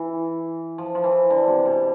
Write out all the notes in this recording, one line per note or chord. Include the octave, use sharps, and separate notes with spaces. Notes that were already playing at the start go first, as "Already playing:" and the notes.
Already playing: E3
F3
F3
E3
D3
C3
B2